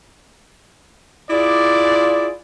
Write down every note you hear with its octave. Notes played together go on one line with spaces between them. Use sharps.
E4 F4 G#4 D5